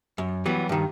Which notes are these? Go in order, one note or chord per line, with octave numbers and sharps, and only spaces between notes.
F#2
E3 F#3 G3 B3
G2 D#3